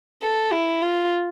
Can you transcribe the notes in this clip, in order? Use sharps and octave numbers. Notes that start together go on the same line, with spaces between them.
A4
E4
F4